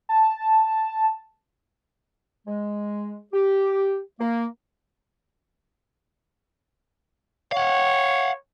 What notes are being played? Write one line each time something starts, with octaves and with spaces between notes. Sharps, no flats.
A5
G#3
G4
A#3
C#5 F5 F#5